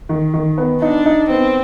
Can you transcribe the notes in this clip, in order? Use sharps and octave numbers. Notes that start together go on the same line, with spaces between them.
D#3
D#3
B3
D4 D#4
D#4
B3 C4